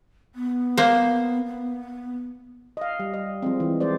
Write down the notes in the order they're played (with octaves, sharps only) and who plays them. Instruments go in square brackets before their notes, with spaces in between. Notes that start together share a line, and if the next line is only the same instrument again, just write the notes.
[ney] B3
[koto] A#3 C5
[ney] B3
[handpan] D#5 F5
G3
D#5
F3 G#3 C4
E3
G#3 C5 D5